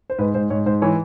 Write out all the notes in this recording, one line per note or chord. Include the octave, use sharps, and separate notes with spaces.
C5
G#2 B4
G#2 C5
G#2 C#5
G#2 C5
E3 C#5